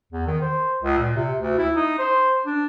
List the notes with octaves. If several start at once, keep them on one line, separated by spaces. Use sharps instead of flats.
E2
D#3
C5
C#2
A#2
C3
D2
E4
D#4
C5
D4